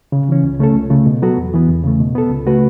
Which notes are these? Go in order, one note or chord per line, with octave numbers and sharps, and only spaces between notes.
C#3
E3 C#4
C#2
C#3 A3 C#4 A4
C#2
C#3 A3
B2
F#3 B3 F#4 A4
E2
E3 B3
E2
C#3 A3
B2
B3 A4
C#2
C#3 A3 F#4 B4